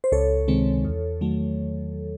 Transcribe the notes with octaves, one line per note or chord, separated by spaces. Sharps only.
C5
C#2 A4 C#5
C3 D#3 G#3 C4
E2
D#3 F#3 A3